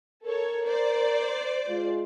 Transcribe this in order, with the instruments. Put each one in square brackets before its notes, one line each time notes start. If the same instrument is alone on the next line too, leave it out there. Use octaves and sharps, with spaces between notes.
[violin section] A4 C#5 [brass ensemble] A#4
[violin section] C5 D5
[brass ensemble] G#3 F4